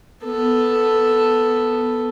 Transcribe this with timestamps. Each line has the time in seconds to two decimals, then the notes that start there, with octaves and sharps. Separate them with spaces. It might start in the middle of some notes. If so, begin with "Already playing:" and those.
0.24 B3 A4